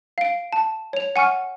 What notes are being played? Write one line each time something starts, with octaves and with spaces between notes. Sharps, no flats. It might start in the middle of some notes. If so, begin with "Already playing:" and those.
F5 D7
A5
C#5 F7
F#5 G#5 C#6 F6